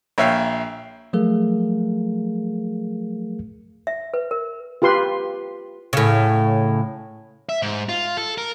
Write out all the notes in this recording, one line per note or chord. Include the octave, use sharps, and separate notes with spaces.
A#1 C#5 E5 F5 G5
F3 F#3 A3 G#4 A#4 F5
E5
B4
A#4
F4 G4 B4 C6
A2 C#3
E5
G#2
F4
A4
A#4